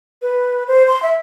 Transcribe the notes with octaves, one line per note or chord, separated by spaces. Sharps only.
B4
C5
C6
E5